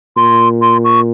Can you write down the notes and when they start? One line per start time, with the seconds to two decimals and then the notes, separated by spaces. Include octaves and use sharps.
0.16 A#2 C6
0.62 C6
0.84 C#6